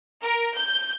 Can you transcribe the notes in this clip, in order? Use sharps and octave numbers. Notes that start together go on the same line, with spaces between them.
A#4
G6